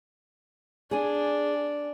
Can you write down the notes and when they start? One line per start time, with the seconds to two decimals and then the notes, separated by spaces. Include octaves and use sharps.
0.91 D4 G#4 G#5